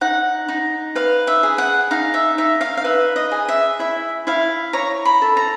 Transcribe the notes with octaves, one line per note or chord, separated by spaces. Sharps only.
D#4 F#5
D#4
B4 F5
E5
G#4
F#5
D#4 F5
E5
D#4 E5
F5
F5
B4 E5
D#5
G#4
E5
E4 E5
E4 F5
C#5 A#5
B5
A4
A#5